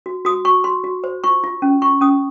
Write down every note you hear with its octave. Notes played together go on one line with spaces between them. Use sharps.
F#4
F#4 D#6
F#4 C#6
F#4 C6
F#4
C5
F4 C#6
F4
C#4
F4 C#6
C#4 D#6